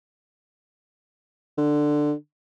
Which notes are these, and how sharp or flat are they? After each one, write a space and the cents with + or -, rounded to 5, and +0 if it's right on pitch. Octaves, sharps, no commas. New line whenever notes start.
D3 +10